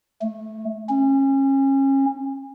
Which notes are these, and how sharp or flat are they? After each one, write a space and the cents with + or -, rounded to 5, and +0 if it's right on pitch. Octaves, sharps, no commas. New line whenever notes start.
A3 -10
C#4 -30